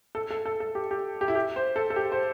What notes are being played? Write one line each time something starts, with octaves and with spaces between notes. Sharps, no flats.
A4
A4
A4
A4
G4
G4
G4
E4
G4
C5
A4
A4
G4
C5